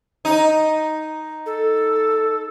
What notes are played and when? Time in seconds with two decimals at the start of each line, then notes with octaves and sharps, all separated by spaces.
0.25 D#4
1.46 A4